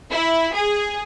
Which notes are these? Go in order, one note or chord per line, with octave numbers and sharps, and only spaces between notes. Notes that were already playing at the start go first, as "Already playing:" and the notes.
E4
G#4